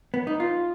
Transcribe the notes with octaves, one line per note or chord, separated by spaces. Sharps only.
B3
D#4
F4